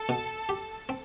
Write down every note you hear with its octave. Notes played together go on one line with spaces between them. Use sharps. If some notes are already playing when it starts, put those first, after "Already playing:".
Already playing: A4
B2
G4
C4